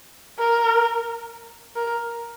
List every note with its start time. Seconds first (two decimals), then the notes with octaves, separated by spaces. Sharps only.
0.39 A#4
1.76 A#4